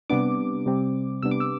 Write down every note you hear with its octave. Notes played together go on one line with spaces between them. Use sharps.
C3 G3 B3 D4 D6
C3 G3 C4
C3 G3 B3 D4 E6
D6
E6